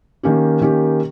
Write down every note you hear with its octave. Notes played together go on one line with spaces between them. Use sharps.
D#3 A#3 C#4 G4
D#3 A#3 C#4 G4